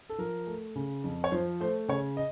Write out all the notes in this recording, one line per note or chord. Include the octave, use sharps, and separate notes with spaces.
A4
F3 A#4
A3
C#3
F2
C#5
F3 C5
A3 C5
C#3 C#5
D#5